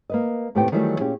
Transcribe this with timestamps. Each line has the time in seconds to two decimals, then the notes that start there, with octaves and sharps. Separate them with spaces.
0.10 A#3 B4 D#5
0.55 D#2 A2 C3 B3 G4 G5
0.72 D#3 E3 F#3 G3 A3
1.00 A#2 C#4 G4 G#4